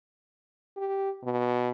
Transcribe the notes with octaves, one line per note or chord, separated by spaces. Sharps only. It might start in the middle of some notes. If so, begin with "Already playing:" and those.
G4
B2